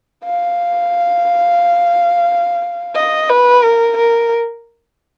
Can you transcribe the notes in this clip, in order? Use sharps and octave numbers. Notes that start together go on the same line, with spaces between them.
F5
D#5
B4
A#4
A#4